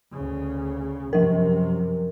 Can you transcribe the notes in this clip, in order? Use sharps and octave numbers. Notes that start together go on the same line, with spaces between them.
D2 C#3
F#2 C3 F3 A#4